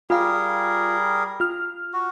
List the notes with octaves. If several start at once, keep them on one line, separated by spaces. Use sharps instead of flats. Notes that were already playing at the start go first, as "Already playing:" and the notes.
G3 F4 G#4 A#4 F5
F4 F6
F#4